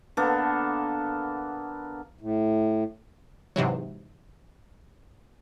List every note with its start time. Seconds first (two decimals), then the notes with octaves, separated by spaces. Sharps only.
0.17 D3 A#3 B3 A4
2.21 A2
3.56 G#2 C3 E3 F#3